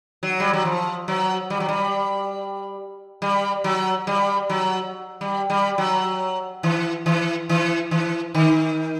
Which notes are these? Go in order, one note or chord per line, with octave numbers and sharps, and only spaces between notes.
F#3
G3
F#3
F3
F#3
G3
F#3
G3
G3
F#3
G3
F#3
G3
G3
F#3
E3
E3
E3
E3
D#3